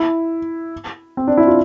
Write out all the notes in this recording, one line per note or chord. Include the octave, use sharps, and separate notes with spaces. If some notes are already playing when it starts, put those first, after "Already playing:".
Already playing: E4
C4
D4
E4
F4